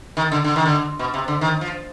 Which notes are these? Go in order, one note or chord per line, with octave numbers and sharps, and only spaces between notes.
D#3
D3
D3
D#3
D3
B2
C3
D3
D#3
F3